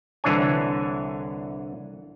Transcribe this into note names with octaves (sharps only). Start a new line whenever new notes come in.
C2 D3 E3 D4 C#5 G#5